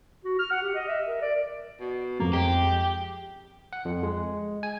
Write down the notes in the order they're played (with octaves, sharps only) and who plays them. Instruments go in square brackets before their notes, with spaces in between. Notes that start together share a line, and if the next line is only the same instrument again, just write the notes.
[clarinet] F#4
F6
F#5
G4
D#5
E5
A#4
D5
[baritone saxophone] B2
[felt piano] F2 [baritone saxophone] A#3
[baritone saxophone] G#3 [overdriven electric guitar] G4
[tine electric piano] F#5
F2
G#3
G#5